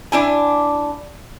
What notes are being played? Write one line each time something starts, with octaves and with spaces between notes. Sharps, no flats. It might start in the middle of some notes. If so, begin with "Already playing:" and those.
D4 E4 G#5